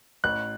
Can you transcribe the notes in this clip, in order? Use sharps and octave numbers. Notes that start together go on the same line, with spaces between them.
A1 F#6